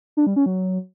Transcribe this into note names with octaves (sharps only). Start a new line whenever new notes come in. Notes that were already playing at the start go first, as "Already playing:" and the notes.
D4
G3
C#4
F#3